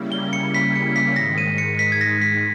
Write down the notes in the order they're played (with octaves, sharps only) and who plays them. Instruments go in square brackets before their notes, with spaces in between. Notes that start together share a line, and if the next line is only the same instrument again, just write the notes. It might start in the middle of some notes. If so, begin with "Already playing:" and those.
Already playing: [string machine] C#3 G3 A#3 C#4 E4
[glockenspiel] G7
C#7
B6
C#7
B6
[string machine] G#2 D#3 G#3 [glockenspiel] A#6
[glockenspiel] D#7
C#7
B6
G#6
A#6
B6